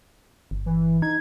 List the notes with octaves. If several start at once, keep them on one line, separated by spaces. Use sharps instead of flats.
G1
E3
D#4 G#6